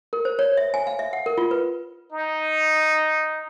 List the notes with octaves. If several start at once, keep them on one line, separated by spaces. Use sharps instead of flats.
A#4
C5
C#5
E5
G#5
F5
E5
F#5
A#4
F4
B4
D#4